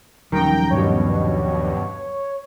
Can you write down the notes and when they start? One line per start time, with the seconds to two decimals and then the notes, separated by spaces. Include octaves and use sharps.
0.32 D#1 F#2 D#3 F3 G3 G5 A#5
0.71 G2 B2 C#5